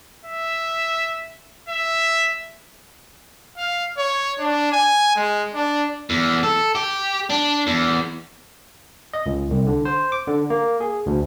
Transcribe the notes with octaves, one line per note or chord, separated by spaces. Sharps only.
E5
E5
F5
C#5
D4
G#5
G#3
D4
E2
A4
G4
D4
E2
D#5
C#2
C2
D3
C5
D6
D3
A#3
G#4
D2